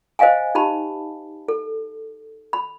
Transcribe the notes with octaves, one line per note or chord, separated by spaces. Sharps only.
C5 D#5 F5 G5 G#5
D#4 G4 A5 B5
A4
B5